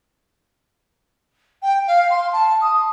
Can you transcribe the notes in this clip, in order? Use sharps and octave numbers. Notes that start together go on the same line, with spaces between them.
G5
F5
C6
A5
D#6